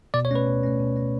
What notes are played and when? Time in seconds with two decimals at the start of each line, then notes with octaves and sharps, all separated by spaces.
0.14 B2 D5
0.25 C#5
0.31 A3 C#4 B4
0.47 B2
0.63 A3 C#4
0.80 B2
0.96 A3 C#4